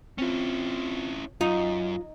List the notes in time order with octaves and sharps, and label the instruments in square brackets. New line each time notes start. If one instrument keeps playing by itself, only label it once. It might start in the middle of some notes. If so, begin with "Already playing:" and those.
[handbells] C4 F4 [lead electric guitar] C#4 E4
[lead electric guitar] F#2 [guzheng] D#4 [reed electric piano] F4 [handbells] D#5